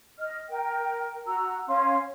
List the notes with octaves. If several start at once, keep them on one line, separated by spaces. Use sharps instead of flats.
D#5 F6
A#4 G5
F#4 A#5 E6
C#4 F5 C6